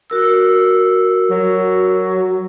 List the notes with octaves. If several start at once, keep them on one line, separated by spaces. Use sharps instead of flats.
F#4 A#4 E6
F#3